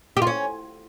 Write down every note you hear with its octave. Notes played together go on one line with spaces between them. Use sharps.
G4
F4
C#4